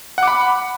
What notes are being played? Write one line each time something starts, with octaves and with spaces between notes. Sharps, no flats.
F#5 B5 D6